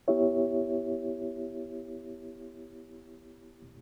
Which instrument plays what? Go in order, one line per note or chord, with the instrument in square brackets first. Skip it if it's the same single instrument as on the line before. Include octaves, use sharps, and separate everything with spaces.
[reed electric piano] B3 E4 G4 C#5 E5